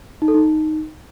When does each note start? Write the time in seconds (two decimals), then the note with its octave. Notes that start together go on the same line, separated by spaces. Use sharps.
0.22 D#4
0.28 A4
0.34 D#4